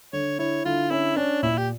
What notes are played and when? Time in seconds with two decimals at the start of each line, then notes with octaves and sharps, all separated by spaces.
0.13 D3 C#5
0.39 E4 C#5
0.65 D3 F4
0.91 C#4 E4
1.16 C#4 D4
1.43 A#2 E4
1.58 G4